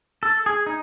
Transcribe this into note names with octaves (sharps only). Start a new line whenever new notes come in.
A4
G#4
D#4